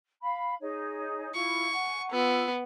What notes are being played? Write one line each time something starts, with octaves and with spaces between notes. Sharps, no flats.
F5 B5
D#4 G#4 C#5
E4 F4 C#6
F#5 G#5
B3 F4 E6